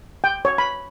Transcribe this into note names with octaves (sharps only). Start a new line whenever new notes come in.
G5
C#5
B5